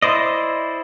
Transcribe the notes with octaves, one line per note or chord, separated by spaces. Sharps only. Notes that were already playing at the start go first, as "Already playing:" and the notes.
E4 C5 D5 D#5